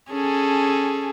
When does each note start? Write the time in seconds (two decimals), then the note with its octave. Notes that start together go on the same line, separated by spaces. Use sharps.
0.10 C#4 G#4 A4